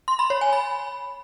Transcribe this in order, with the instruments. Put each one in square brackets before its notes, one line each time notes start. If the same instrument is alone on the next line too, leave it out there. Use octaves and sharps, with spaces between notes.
[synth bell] C6
B5
C#5
G#5
B5